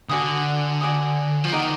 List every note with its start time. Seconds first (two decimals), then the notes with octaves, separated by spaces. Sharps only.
0.09 D3 F#4 D5 G#5 D#6
0.81 F#4 D5 G#5 D#6
1.44 F3
1.52 D#3 A#4 D#5 F#5 D6